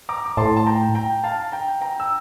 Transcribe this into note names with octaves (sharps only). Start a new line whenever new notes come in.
A#5 D6
D6
A2 A5 C6
A5
G5 A#5
G5 A#5
F5 A5
G5 A#5
G5 A#5
E6